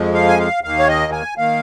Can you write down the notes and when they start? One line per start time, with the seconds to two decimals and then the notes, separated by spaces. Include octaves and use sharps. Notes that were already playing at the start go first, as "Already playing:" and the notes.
Already playing: F2 F3 G#3
0.14 F5
0.28 G#5
0.39 F5
0.63 D#2 D#3 A#3 F5
0.79 C#5
0.88 D#5
1.12 G#5
1.37 D#3 A#3 F5